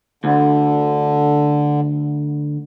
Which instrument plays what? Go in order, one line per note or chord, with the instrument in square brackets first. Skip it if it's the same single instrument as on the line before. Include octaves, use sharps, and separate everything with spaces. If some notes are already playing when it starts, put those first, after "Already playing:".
[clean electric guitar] D2 [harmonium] D3